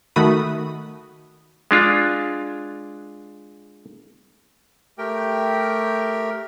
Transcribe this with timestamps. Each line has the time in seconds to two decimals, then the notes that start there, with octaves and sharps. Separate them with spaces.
0.16 D#3 A3 F#4 B5 D#6
1.71 G#3 D4 F4
4.98 A3 G4 A#4 G5